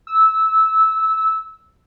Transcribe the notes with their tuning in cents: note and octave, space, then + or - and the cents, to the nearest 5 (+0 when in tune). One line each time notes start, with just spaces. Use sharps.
E6 -15